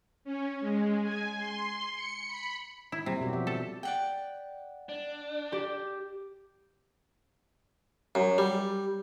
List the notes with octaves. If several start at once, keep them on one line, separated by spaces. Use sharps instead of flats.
C#4
G#3
G#5
C6
C#7
B5
E4
C3 F#3 G3 A#3
B2 F#4 G4
F3 E5
A4
D5 F#5 G5
D4
G4
F#2
G3